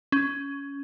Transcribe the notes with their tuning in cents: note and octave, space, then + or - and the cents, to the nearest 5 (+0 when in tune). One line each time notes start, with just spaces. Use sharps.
C#4 +10